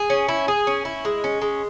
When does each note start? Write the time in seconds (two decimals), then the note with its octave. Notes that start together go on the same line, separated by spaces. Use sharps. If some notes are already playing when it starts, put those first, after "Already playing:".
Already playing: G#4
0.10 C#4
0.29 E4
0.48 G#4
0.67 C#4
0.85 E4
1.05 G#3
1.24 C#4
1.42 G#3